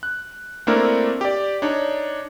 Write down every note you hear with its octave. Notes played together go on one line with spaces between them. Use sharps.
F#6
A3 A#3 C4 D4 E4 A#4
G4 D5
D4 D#4 C#5